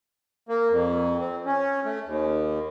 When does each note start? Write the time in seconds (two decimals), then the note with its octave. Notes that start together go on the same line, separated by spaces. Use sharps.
0.49 A#3
0.70 F2
1.20 C4
1.46 C#4
1.85 A3
2.06 D#2